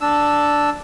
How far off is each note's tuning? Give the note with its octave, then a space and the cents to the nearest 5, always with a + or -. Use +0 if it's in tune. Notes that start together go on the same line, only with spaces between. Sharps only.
D4 +0 E6 +0